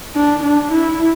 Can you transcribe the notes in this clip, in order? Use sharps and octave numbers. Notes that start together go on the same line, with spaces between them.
D4
D4
E4